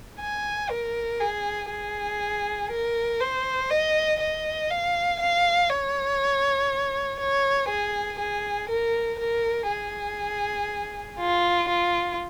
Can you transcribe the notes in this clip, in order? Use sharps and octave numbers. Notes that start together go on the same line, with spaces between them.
G#5
A#4
G#4
G#4
A#4
C5
D#5
D#5
F5
F5
C#5
C#5
G#4
G#4
A#4
A#4
G#4
F4
F4